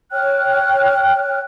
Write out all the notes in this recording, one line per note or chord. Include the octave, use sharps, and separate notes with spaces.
C#5 G5 F6 F#6